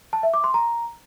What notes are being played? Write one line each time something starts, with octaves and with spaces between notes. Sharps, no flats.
A5
E5
D6
C6
A#5